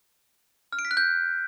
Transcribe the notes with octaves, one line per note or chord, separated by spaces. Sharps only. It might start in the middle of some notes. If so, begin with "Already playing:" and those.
F6
D7
B6
F#6
G6